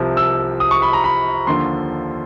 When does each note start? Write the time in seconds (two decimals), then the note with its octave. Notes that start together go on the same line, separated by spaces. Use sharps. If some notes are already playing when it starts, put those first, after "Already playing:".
Already playing: C2 C3 F3
0.17 E6
0.60 D#6
0.71 C#6
0.82 B5
0.93 A#5
1.04 B5
1.47 D#2 D3 F3 C6